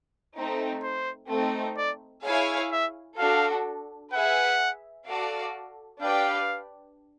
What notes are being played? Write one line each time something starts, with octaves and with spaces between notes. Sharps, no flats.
A3 C4 D#4
C5
A3 C4 D#4
D5
E4 G#4 C#5 F5 G#5
E5
D4 F#4 A4 F5
G#4 B4 E5 F#5
F#4 A4 D5 F5
D4 G4 B4 D5 F5 G5